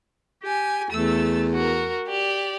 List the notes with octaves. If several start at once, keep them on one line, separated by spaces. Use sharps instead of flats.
G4 G#5
E2 A3 E6 A6
F#4 A#4
G4 D5